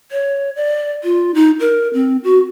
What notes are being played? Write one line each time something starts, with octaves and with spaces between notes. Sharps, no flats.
C#5
D5
F4
D#4
A#4
C4
F#4